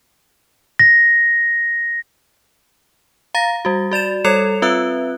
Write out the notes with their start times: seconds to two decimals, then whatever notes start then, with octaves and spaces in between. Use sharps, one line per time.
0.79 A#6
3.35 F5 A#5 A6 A#6
3.65 G3 F#4
3.91 F#4 D5 A6 E7
4.24 G3 A4 C#5 G#6 C#7 F7
4.62 C4 F4 B4 E5 E6 F#6